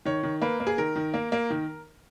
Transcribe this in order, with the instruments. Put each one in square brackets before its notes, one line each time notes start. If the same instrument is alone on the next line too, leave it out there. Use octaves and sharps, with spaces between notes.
[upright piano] D#3 C#5
D#3
A#3 B4
A#3
G#4
D#3 A#4
D#3
A#3
A#3
D#3